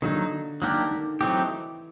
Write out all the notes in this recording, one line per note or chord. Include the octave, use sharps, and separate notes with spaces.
D3 D#3 F#3 A#3 D#4
D#3 F#3 A#3 D4 G4 A#4
D#3
E3 F#3 A3 C4 D#4 G4